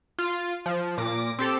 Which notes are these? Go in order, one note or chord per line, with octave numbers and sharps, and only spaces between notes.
F4
F3
A#2 D6 A#6
C4 G4 A4